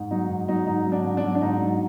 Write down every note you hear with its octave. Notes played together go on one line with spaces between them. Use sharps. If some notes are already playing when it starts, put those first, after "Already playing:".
Already playing: G#2
F#3 D#4
G#2
F#3 D#4
G#2 D#4
F#3
D4
G#2
D4
F#3
D4
G#2 D#4
F#3